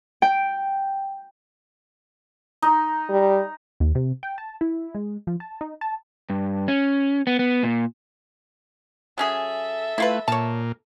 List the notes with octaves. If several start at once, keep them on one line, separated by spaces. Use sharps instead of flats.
G5
D#4
G3
D#2
C3
G5
A5
E4
G#3
F3
A5
D#4
A5
G2
C#4
B3
B3
A#2
F#3 C#4 G#4 A4 E5
A3 E4 F4 B4
A#2 C#5 A5